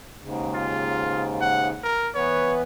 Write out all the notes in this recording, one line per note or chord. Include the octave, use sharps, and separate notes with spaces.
D#2 G#2 C#3
F4
F#5
A#4
E3 B3 B4 C#5